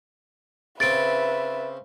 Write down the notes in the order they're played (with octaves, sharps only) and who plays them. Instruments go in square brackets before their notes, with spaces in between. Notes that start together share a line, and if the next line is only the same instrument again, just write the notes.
[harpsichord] C#3 C4 [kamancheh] B4 E5 [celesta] A6 D7